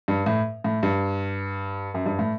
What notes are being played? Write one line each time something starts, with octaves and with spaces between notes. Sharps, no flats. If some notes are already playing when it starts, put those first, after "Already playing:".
G2
A2
A2
G2
F#2
G2
A2